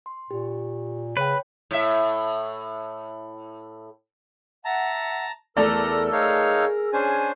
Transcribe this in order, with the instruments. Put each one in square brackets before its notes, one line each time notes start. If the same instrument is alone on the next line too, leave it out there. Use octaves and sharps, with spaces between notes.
[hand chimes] C6
[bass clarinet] A#2 [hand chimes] G4
[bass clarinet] C#3 [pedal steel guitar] B4 [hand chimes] C#5 G5
[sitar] A2 E5
[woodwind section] E5 F#5 [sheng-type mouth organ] A5 A#5
[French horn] E2 [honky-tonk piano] A3 A4 D5 [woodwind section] A#4 E6 [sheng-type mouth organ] A#5 F6
[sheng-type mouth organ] D#4 C#5 F5 [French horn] G#4
[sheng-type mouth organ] C#4 D4 C5 [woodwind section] G#5